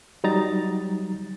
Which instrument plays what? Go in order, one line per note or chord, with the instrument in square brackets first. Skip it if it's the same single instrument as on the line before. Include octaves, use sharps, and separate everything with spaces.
[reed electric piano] F#3 G3 D#4 A#5 A6